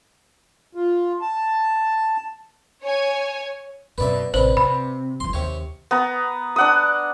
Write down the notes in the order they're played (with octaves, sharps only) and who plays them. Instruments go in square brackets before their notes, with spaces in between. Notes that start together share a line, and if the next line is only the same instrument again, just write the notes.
[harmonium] F4
A5
[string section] C#5 G#5
[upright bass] F#2 B2 [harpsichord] B4 D5 E5
[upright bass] A1 C3 [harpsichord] D4 B4 [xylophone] C5 F#7
[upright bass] C3 [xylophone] B5
[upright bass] F#1 E3 [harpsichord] C6
[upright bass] D#2 [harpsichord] C3 C#5
[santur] B3 A#5
D4 F#5 D#6